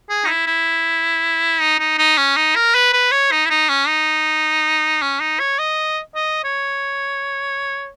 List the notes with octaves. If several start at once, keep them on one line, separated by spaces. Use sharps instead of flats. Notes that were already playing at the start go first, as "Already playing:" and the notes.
G#4
D#4
E4
E4
D#4
D#4
D#4
C#4
D#4
A#4
B4
B4
C#5
D#4
E4
D#4
C#4
D#4
C#4
D#4
C#5
D#5
D#5
C#5